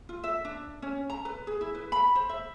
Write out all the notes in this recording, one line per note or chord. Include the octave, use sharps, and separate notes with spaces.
F4
E5
D4
C#4
A#5
B4
G#4
E4
B4
B5
C5
E5